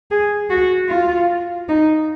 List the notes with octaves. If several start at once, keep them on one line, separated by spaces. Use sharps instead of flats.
G#4
F#4
F4
D#4